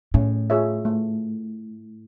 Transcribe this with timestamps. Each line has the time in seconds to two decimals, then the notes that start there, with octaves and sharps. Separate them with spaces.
0.14 A2 C#4
0.50 F4 G#4 C#5 E5
0.85 A3